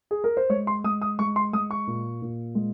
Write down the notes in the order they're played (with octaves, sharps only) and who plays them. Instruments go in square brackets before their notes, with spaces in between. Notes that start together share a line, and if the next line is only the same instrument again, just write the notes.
[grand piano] G#4
A#4
C5
G#3 C#5
C6
G#3 D#6
D#6
G#3 C#6
C6
G#3 D#6
C#6
A#2
A#2
G#3